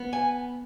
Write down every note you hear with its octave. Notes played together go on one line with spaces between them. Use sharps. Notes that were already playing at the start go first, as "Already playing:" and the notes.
Already playing: B3
G#5